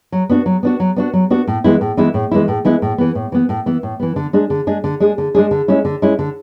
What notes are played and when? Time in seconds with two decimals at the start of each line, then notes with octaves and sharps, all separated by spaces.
0.12 F#3
0.29 B3 D4 F#4
0.46 F#3
0.63 B3 D4 F#4
0.80 F#3
0.96 B3 D4 F#4
1.13 F#3
1.30 B3 D4 F#4
1.47 A2
1.64 E3 G#3 B3 E4
1.81 A2
1.97 E3 G#3 B3 E4
2.14 A2
2.31 E3 G#3 B3 E4
2.48 A2
2.65 E3 G#3 B3 E4
2.82 A2
2.98 E3 B3
3.15 A2
3.32 E3 B3
3.49 A2
3.66 E3 B3
3.83 A2
4.00 E3 B3
4.16 D3
4.33 G#3 D4 G#4
4.50 D3
4.67 G#3 D4 G#4
4.84 D3
5.00 G#3 D4 G#4
5.18 D3
5.35 G#3 D4 G#4
5.51 D3
5.68 G#3 C#4 E4
5.85 D3
6.02 G#3 C#4 E4
6.19 D3